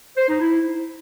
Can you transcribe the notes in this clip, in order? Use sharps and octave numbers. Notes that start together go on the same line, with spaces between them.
C5
D#4
E4